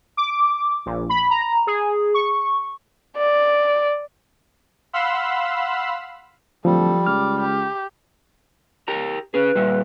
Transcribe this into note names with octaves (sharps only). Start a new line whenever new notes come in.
D6
A#1
B5
A#5
G#4
C#6
D5
F5 F#5 B5 C6 E6
D1 F3 G3 A4
C#2 D6 F6
G4
G4 A#4 A#5
C#4 G#4 B4
A#2 G3 E5